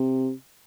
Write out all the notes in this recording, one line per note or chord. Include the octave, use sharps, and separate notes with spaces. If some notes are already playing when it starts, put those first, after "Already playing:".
Already playing: C3